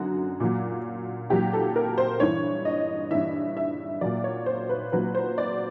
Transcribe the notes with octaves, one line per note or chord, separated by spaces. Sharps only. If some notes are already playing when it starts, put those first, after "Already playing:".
Already playing: F#2 D3 F#3 F#4
A#2 F#3
A#2 F#3 G4
A4
A#4
C5
G2 E3 C#5
D#5
G2 E3 E5
E5
A#2 F#3 D5
C#5
C5
B4
A#2 F#3 B4
C5
D5